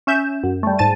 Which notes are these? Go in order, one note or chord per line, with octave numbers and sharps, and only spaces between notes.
C#4 E5 G6 E7
F#2
G3 A3
G#2 A5 A6 D#7